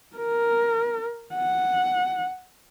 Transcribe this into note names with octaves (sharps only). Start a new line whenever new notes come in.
A#4
F#5